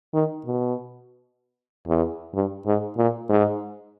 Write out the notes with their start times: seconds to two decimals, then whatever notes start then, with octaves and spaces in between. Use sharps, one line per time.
0.14 D#3
0.46 B2
1.87 E2
2.34 G2
2.66 G#2
2.97 A#2
3.29 G#2